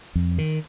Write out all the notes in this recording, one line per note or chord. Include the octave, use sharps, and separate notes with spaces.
F2
D#3